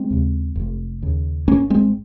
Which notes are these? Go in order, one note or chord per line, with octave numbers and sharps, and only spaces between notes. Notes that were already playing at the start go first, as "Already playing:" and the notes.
Already playing: G#3 C4
D#2 C#3
F1
D#2 C#3
G#1 A#3 C#4
G#3 C4